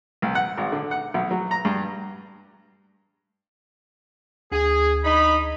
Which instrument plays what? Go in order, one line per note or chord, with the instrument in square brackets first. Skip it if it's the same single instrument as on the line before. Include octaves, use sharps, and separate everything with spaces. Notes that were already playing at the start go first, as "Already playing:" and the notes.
[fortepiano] C2
F#5
G#1
D3
F#5
B1
F#3
A#5
G2
[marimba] D2 [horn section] G#4
[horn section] D#4 B5